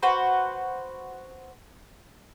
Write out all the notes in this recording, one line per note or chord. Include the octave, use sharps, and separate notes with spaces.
F#4 B4 C5